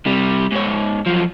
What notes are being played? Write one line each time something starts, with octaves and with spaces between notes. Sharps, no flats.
C3 G3
G#2 C#5
F#2 F3